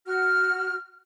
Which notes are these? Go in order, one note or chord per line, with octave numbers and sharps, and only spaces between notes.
F#4 F6